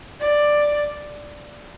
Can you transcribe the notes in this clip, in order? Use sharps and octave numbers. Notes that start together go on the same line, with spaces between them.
D5